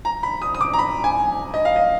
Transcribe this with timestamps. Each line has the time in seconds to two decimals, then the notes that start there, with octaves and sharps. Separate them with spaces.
0.05 A#5
0.23 B5
0.42 D#6
0.55 D#6
0.61 D6
0.73 A#5
0.79 B5
1.04 G#5
1.54 D#5
1.65 F5
1.76 D#5